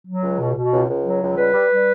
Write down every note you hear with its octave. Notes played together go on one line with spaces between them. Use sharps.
F#3
C#2
B2
B2
C#2
C#2
F#3
C#2
G3 B4
G3
G3